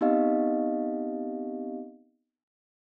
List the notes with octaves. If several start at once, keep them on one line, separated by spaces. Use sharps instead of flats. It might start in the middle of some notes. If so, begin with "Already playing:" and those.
B3 C4 D#4 G4 D#5 F5